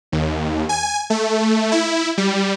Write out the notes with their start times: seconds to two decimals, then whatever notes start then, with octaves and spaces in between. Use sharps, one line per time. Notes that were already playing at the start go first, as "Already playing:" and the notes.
0.12 D#2
0.69 G#5
1.10 A3
1.72 E4
2.18 G3